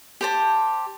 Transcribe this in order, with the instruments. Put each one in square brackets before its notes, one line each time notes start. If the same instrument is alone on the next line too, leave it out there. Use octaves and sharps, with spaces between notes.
[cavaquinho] G4 C5 A5